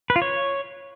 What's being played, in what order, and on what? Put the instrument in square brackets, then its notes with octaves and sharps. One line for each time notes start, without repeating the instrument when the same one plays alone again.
[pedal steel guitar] B4
F4
C#5